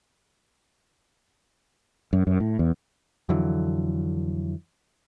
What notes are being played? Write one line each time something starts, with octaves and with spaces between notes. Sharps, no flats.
F#2
F#2
A2
E2
F2 D3 E3 F#3